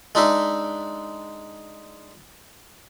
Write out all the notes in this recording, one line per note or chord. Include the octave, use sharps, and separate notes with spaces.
G#3 D4 D#4 E5